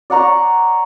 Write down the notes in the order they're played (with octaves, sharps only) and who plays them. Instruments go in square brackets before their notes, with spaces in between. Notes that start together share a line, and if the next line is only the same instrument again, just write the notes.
[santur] D5 F#5 A#5 C#6